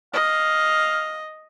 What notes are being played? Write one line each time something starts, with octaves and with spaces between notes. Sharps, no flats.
D#5 F5